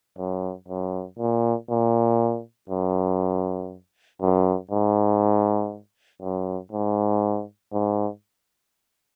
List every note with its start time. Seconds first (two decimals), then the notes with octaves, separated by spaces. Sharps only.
0.18 F#2
0.68 F#2
1.19 A#2
1.70 A#2
2.70 F#2
4.21 F#2
4.71 G#2
6.22 F#2
6.72 G#2
7.72 G#2